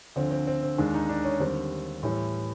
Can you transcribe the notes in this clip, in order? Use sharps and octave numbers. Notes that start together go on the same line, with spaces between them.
D2 D3 F3 C4
C4
C4
C4
D#2 D#3 G#3 D4
D#4
D4
C#4
D#2 D3 G3 C4
A2 E3 G3